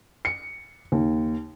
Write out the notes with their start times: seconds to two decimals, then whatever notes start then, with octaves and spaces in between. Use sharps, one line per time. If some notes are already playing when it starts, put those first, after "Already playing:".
0.25 C#7
0.92 D#2